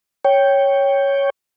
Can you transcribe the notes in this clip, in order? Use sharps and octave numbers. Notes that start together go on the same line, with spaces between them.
C#5 G5